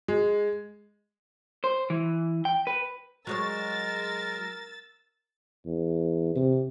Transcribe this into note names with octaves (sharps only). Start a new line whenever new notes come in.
G#3
C5
E3
G5
B4
F#3 G#3 A#4 C#5 E6 A6
E2
C3